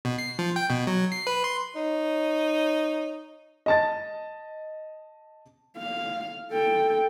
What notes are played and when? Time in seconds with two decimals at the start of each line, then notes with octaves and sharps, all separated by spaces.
0.05 B2
0.18 C7
0.39 F3
0.56 G5
0.70 B2
0.87 F#3
1.12 C7
1.27 B4
1.44 C6
1.76 D#4 C#5
3.66 D#5 A5 A6
5.78 F5
6.52 A4 G5